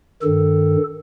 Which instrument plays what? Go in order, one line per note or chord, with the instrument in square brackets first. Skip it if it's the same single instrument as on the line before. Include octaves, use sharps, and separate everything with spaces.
[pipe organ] G2 D#3 A4